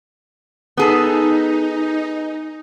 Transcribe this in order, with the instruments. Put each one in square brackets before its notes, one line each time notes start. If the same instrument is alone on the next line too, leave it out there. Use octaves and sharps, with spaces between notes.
[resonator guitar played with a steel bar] B3 G#4 A4 [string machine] D#4